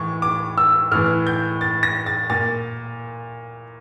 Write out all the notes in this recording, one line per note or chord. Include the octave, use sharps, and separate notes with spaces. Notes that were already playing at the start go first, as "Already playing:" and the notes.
Already playing: A2 E3 C#6
D6
E6
A2 E3 F6
G6
A6
A#6
A6
A#2 A6